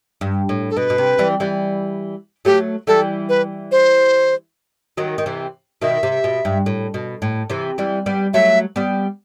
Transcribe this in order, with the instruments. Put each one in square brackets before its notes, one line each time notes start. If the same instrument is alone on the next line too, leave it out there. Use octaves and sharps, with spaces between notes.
[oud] G2
A2
[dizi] A4
[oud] B2 [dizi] B4
[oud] B2
C3
E3 G3
E3 G3
[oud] F#3 A3 [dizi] G4
[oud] E3 G3 [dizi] A4
[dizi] B4
C5
[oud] D#3 F#3
D#3
C3 E3
[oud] B2 D#3 [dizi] E5
[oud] C3
B2
G2
A2
B2
A2
C3 E3
E3 G3
G3 B3
[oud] F#3 A3 [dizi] E5
[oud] G3 B3